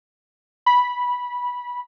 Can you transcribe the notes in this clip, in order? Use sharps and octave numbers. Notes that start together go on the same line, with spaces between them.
B5